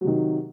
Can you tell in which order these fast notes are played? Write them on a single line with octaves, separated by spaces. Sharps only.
F#3 C3 D#3